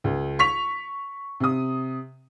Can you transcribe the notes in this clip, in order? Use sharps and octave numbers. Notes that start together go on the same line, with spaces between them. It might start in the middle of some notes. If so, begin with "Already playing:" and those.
C#2
C#6 B6 F7
C3 D#6